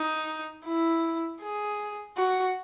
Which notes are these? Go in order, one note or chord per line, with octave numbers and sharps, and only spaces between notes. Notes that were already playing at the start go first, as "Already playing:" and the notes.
Already playing: D#4
E4
G#4
F#4